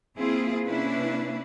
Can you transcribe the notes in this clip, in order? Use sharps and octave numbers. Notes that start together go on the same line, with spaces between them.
A#3 C4 E4 F4 G#4
C3 A#3 C#4 D4 E4 B4